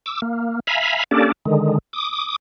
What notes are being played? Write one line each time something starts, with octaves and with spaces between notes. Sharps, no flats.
D6 E6
A#3
E5 F5 G#5 A#5 B5
A#3 C#4 D4 G4 A4 D5
D3 D#3 G#3
D6 D#6